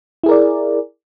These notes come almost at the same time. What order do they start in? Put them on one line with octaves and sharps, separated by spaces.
E4 G#4 A#4 D5